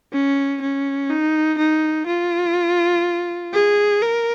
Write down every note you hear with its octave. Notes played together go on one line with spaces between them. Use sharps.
C#4
C#4
D#4
D#4
F4
G#4
A#4